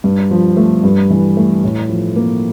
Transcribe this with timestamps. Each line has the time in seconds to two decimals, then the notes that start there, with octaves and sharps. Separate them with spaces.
0.04 G2
0.31 F3
0.57 A3
0.84 G2
1.10 E3
1.37 A3
1.64 A2
1.89 F3
2.16 A#3